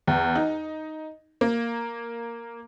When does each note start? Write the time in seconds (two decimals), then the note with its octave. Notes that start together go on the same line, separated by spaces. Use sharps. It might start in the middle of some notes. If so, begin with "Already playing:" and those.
0.07 E2
0.35 D#4
1.41 A#3